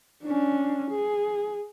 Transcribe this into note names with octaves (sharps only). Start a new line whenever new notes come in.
C#4 D4
G#4